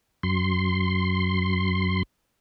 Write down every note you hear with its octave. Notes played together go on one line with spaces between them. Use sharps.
F#2 C6